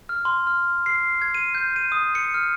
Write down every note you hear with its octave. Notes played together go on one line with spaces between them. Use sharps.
F6
C6
F6
C7
G#6
D#7
G6
D#7
D#6
C#7
F6